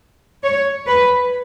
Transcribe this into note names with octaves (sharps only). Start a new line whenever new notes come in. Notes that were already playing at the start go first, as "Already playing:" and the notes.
C#5
B4